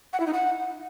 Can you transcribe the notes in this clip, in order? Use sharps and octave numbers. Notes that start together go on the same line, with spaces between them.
F#5
E4
D#4
F#5